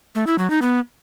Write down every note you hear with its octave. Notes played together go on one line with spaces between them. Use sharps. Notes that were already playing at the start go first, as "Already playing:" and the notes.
A3
E4
F#3
D#4
B3